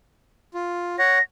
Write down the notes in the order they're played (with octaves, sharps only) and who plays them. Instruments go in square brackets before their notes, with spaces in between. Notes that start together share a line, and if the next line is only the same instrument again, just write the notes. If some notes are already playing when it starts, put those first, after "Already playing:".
[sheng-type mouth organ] F4
[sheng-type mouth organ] C#5 F#5 [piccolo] A#6